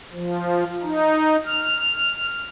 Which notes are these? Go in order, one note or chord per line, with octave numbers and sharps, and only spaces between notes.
F3
D#4
F6